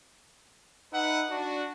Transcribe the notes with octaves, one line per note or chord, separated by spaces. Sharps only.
D#4 B4 E5 F#5
D4 F#4